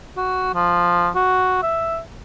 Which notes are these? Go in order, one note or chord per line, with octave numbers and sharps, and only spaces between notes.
F#4
F3
F#4
E5